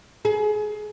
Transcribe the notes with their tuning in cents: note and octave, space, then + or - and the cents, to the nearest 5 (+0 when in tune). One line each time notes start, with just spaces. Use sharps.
G#4 +25